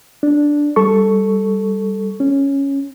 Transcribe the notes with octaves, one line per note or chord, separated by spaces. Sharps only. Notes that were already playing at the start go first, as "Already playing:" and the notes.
D4
G3 A4 C#6
C#4